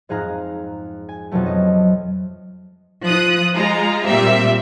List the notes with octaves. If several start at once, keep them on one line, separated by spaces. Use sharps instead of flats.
F2 G#2 G#4 F5 A#5 F#6
G#5
F2 B2 F3 F#3 A3
A3 D#5
F3 D#6 F#6
G#3 F4 A#5
A#2 G3 C4 E5